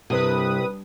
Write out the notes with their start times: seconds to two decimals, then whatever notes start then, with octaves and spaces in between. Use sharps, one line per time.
0.10 C2 G2 C3 B4 D#6